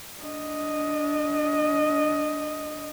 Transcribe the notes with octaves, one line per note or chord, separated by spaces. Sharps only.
D4 D#5